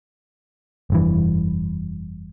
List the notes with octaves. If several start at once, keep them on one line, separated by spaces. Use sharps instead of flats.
F1 G2 E3